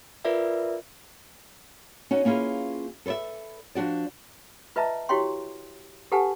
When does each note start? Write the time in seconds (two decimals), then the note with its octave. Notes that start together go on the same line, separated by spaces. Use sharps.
0.25 F4 A#4 B4 D5 E5
2.11 C#4 D#4 F#4
2.25 A#3 C#4 E4 F4 G#4 B4
3.06 A4 B4 C#5 D5 E5
3.75 F3 D4 F#4 D5
4.76 F4 B4 D#5 E5 A5 A#5
5.09 E4 F#4 G4 C#5 G5 C6
6.12 G4 A4 B4 F#5 G#5 A5